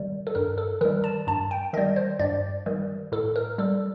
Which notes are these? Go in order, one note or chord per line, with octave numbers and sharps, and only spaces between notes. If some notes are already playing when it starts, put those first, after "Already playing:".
Already playing: D#3 G3
A4
G2 A#4
A4
D#3 G3 A#4
A5
G2 A5
G5
D#3 G3 D#5
C5
G2 D5
D#3 G3
A2 A4
A#4
G3 A4